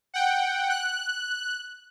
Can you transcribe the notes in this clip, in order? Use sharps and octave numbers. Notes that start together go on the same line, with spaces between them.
F#5 G5
F#6